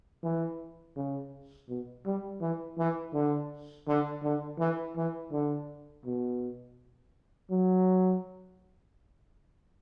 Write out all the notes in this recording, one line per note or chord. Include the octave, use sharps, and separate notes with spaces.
E3
C#3
B2
G3
E3
E3
D3
D3
D3
E3
E3
D3
B2
F#3